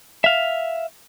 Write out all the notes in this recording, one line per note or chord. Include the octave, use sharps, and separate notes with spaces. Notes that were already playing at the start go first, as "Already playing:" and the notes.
E5 F5